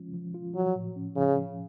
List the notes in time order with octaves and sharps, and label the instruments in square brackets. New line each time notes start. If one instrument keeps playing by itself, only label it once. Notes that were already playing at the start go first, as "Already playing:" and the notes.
Already playing: [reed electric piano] F3 G#3 C#4 F4
F3
F4
[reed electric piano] F3 [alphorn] F#3
[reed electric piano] A2
C#4
[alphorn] C#3 [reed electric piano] F3
[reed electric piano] C#4